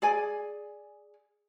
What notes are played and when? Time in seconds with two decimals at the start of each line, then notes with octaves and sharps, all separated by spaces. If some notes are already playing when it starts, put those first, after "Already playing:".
0.02 G#4 D5 G#5